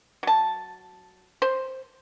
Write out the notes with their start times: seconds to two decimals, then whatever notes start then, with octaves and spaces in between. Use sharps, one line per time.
0.23 F#3 A5
1.42 C5